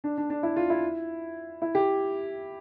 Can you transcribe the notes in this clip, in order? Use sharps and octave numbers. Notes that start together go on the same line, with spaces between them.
D4
D4
D4
E4
F4
E4
E4
G4